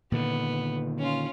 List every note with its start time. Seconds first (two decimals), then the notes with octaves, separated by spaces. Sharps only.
0.12 A#2 D3 D#3 B3
0.99 C#4 F4